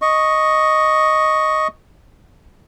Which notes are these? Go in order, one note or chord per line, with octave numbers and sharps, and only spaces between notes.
D#5 C#6